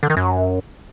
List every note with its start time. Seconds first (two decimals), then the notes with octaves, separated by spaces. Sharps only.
0.03 D3
0.10 D#3
0.17 F#2